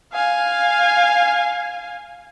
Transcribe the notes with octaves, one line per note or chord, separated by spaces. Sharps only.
F5 G#5